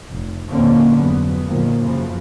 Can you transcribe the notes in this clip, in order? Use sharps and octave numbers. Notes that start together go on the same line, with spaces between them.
F1
D#2 A#2 D3 A#3 C4 C#4
F2 G#2 F#3 B3
A#2 D3 D#3 F3 F#3 A#3
F#2 C#3 E3 F3